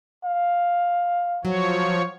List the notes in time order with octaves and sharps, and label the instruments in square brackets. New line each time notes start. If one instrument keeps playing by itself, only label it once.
[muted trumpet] F5
[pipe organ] F3 C#5 [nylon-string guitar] F#3